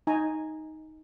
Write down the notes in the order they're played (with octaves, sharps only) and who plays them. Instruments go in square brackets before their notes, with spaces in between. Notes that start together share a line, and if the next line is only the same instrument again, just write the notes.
[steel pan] D#4 G#5 A#5